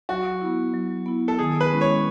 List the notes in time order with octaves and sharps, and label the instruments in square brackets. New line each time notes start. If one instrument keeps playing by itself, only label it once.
[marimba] F#3 [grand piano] F#4
[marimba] B3 E4
F#3
B3 E4
[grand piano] A4
[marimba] D#3 [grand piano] G#4
[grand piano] B4
[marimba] G#3 C#4 E4
[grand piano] C#5